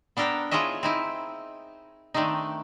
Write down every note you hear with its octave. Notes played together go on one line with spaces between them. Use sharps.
B3 D4 A4 A#4 G5 A#5
E4 F4 G#4 C#5 D#5 E5
C4 D#4 E4
D#3 A3 C4 D4 D#4